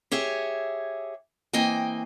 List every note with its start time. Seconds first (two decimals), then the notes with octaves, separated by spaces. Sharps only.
0.12 G4 G#4 C#5 E5
1.53 E3 A#3 C4 D#5 G5 G#5